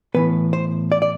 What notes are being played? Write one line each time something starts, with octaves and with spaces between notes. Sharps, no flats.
A2 E3 B3 B4
C5
D5
D5